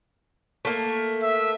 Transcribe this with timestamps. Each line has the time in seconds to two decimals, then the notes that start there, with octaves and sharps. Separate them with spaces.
0.65 A3 A#3
1.23 E5